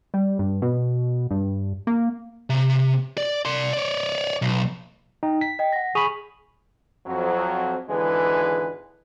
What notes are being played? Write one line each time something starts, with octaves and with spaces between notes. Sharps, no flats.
G3
G2
B2
G2
A#3
C3
D5
D5 C6
C#5 D5
B1
D#4 G5
B6
D#5 G5
F#5 A#6
G#4 B5 C#6 D#7 F7
F2 F#3
G#1 D3 E3 G#3 G#4 B4